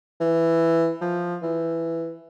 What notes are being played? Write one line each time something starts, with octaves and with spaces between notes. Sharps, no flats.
E3
F3
E3